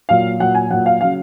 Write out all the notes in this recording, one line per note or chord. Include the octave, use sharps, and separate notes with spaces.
A#2 F#3 F5
A#2 F#3 F#5
G#5
A#2 F#3 F#5
F5
C#3 F#3 F5